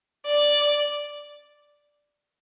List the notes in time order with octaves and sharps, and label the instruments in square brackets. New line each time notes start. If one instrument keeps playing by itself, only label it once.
[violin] D5